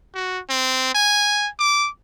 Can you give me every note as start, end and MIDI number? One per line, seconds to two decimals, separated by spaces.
0.15 0.40 66
0.50 0.92 60
0.95 1.49 80
1.59 1.88 86